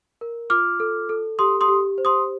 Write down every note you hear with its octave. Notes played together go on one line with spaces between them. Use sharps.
A#4
F4 D6 F6
A4
A4
G4 C6 D#6
C6 D#6
G4
C5
C6 D#6